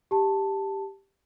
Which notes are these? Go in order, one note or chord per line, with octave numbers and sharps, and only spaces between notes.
G4 A5